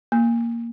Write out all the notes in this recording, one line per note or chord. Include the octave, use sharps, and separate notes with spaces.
A#3